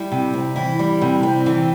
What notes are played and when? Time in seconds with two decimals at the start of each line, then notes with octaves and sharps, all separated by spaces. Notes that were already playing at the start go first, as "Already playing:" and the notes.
Already playing: G3 E4
0.12 C3
0.34 C4
0.56 E3 E4
0.79 G3
1.01 C3
1.23 C4
1.46 E3